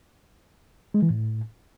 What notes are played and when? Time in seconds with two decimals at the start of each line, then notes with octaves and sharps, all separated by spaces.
0.94 G#3
1.02 E3
1.10 A2